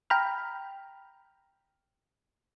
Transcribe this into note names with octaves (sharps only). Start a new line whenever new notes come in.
G5 A#5 B5 F6